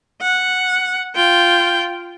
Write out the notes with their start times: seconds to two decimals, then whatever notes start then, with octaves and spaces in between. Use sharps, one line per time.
0.21 F#5
1.15 F4 G5